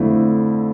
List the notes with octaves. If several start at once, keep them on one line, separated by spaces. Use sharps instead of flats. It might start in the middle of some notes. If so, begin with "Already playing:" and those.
Already playing: F2 D3 A3 E4